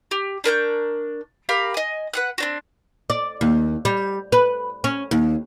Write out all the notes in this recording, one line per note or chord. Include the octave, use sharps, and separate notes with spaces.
G4
D4 A#4 C#6 G6
G4 A#4 F5 B5
D#5 G#5
B4 F#5 F#6
C4 D4 F#4
D5
D#2
G3
B4
C#4
D#2